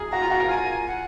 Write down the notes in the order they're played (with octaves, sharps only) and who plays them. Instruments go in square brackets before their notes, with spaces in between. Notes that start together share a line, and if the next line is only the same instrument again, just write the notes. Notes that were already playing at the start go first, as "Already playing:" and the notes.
Already playing: [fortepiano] G#4 A#4
[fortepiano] F#4 [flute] A#5
[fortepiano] F4
F#4
A#4
[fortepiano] F4 [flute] G#5
[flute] F#5